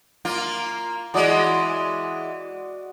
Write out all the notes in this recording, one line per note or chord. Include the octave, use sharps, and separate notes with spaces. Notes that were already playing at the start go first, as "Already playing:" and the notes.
A#3 F4
E3 G#3 F#4 D5 D#5